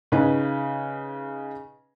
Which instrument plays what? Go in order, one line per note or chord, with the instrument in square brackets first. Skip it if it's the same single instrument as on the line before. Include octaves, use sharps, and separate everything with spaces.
[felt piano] C#3 D#4 B4